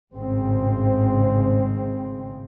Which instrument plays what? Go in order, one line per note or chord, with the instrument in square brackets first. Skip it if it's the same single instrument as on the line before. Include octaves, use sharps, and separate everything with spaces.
[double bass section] G#1 A2 C#3 G#3 C4